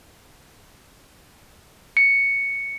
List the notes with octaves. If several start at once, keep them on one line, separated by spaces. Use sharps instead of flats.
C#7